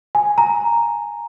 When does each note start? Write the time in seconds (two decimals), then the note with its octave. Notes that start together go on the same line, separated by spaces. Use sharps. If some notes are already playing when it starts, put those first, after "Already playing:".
0.15 G#5
0.38 A#5